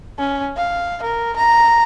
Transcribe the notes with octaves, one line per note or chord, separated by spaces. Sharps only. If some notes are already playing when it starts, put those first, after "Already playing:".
C#4
F5
A#4
A#5